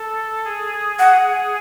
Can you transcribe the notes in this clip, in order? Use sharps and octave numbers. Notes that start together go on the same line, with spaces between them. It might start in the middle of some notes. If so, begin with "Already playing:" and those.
Already playing: A4
G#4
F#5